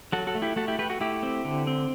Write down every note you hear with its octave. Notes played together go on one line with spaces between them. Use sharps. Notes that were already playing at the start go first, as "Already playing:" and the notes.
F#3 F#4 A4
F#4 A4
A3
E4 G4
A3 F#4 A4
E4 G4
A3 G4 B4
F#4
A3 E4 G4
C4
D3
C4